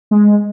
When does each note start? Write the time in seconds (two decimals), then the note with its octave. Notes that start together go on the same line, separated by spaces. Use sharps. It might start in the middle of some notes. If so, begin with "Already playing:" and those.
0.11 G#3